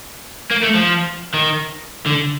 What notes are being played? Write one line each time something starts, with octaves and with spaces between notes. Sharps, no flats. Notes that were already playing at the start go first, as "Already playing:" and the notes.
A#3
A3
F3
D#3
D3